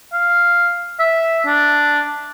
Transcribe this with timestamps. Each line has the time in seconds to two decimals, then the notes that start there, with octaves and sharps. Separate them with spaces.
0.13 F5
0.99 E5
1.46 D4